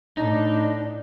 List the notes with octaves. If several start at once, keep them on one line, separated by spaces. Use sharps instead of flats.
A2 D4 D#4